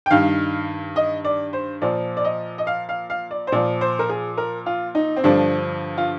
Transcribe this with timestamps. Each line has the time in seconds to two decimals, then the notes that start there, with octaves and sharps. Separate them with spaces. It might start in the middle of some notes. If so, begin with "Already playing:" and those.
0.06 G5
0.11 G2 D#3 F5
0.96 D#5
1.24 D5
1.53 C5
1.82 A#2 F3 D5
2.17 D5
2.24 D#5
2.58 D#5
2.67 F5
2.89 F5
3.10 F5
3.31 D5
3.47 C5
3.52 A#2 F3 D5
3.81 C5
3.99 A#4
4.09 G#4
4.37 A#4
4.66 F4
4.95 D#4
5.16 C4
5.24 G2 D3 F3 D4
5.98 F4